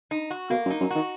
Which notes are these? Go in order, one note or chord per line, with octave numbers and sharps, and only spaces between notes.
D#4
F#4
B2 A#3
F#2
D#4
F#2
D#3 F#4